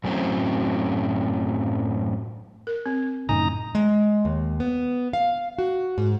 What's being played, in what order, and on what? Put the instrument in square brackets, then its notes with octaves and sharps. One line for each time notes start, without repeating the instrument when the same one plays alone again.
[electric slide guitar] F#2 A2 F#3 C4 C#4
[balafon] A#4
C4
[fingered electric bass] F#2 A2 C#3 [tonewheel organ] D#4 A#5 [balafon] G#5
[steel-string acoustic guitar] G#3
D#2
B3
F5
F#4
G#2